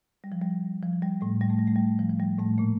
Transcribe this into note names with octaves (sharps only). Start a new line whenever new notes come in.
G3
F3
G3
F3
F3
G3
A2 A3
G3
A3
G3
A3
G3
F3
F3
G3
A2 A3
A#2 A#3